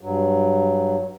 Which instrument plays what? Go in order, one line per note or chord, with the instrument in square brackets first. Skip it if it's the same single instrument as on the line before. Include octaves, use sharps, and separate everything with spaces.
[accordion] G2 F#3